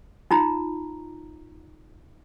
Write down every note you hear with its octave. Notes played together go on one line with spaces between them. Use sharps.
D#4 F4 A#5